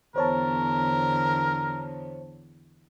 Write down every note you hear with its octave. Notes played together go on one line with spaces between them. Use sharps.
E2 D3 B3 A#4 C5 C#5 A5